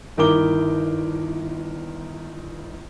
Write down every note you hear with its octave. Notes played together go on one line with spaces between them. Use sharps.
G1 D#3 E4 A#4 D6 G7